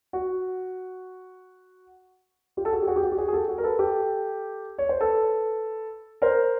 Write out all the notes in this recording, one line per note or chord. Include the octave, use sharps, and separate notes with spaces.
F#4
F4 G4
A4
F#4 G#4
G4
F#4 G#4
G4
F#4
G4
F#4 G#4
G#4
G4 A4
F#4
A#4
A4 B4
G4 A4
C#5
C5
A4 B4
A#4 C5